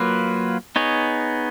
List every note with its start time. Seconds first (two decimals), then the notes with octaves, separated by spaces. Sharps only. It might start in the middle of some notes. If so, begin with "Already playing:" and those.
Already playing: F#3 A#3 F4 B4
0.76 B3 D#4 G#4 C#5